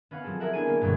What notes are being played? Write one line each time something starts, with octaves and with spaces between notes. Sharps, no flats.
B3 C#4 F5 F#5
F3 F#3 C4 G#4 A4
G#4 A#4 E5 F#5
B3 D4 E4 G#5 D7 D#7
F#3 A#3 C#4
G1 B2 G#4 G5